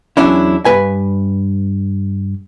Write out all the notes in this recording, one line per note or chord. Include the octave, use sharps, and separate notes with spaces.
E2 F#3 C#4 D4 E4
G2 B4 G#5